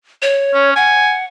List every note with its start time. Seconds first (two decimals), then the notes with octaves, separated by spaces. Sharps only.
0.22 C#5
0.54 C#4
0.76 F#5 G#5